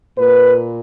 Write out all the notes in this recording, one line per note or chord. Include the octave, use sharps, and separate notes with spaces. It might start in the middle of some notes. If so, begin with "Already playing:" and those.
A#2 A#3 B4